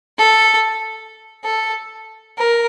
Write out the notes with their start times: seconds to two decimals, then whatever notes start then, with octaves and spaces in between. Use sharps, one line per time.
0.18 A4
1.43 A4
2.37 A#4